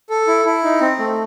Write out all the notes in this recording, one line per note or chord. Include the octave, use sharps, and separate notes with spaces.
A4
E4
E4
D#4
C4
A3